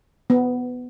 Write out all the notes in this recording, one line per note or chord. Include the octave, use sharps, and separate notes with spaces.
B3